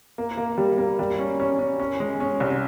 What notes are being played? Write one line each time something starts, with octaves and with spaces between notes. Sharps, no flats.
A#3
A#3
G3
A#3
G3
C#4
C#4
C#4
C#4
G#3
C#4
C2